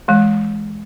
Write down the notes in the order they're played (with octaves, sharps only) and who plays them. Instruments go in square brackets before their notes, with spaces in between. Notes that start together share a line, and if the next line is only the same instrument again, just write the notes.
[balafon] E3 G#3